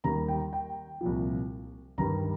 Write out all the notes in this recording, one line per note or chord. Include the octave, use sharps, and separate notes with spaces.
D#2 D#3 G3 A#5
G5
G5
C2 A#2 F3
G2 D#3 G3 A#5